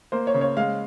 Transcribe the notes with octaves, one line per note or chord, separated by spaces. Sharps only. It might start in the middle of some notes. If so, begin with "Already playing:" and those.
A#3 C5
C#5
C#3
C#5
G#3 F5